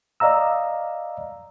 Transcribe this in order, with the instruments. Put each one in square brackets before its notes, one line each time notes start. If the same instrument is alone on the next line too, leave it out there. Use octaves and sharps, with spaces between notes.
[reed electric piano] D5 D#5 F5 A#5 E6